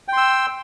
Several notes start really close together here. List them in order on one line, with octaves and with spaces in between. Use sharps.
G5 C6 E6